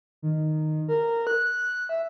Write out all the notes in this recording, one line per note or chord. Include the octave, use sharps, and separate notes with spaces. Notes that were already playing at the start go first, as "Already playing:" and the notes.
D#3
A#4
F#6
E5